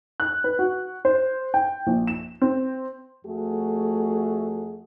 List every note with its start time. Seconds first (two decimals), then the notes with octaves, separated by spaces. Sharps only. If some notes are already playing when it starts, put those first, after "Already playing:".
0.20 F#6
0.44 B4
0.59 F#4
1.05 C5
1.54 G5
1.87 A#1
2.07 E7
2.42 C4
3.25 F2 A3 F#4 G#4